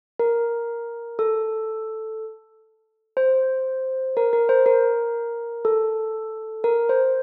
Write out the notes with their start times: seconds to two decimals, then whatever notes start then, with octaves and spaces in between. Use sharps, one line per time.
0.19 A#4
1.19 A4
3.17 C5
4.17 A#4
4.33 A#4
4.49 C5
4.66 A#4
5.65 A4
6.64 A#4
6.89 C5